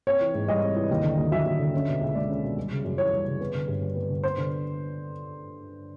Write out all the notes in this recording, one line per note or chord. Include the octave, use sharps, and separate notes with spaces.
C4 C#5
E3
G#2
G3 D#5
C4
E3
D#2
D3
D#2
F#3 E5
D#2
D3
C#4
B2
C#2
G#3 D5
C#4
B2
G3
C#3
F#2
E3 C#5
G3
C#3
B3
D3
G2
G3
B3
D3
B3 C5
D3